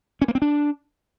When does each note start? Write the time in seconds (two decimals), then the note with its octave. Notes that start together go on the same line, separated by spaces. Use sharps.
0.22 C#4
0.28 A#3
0.35 C4
0.42 D4